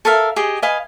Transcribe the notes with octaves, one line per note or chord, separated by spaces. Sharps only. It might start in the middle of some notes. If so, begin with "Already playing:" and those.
A4 A#4 E5 F5
G4 G#4 D#5
B4 D#5 F5 G#5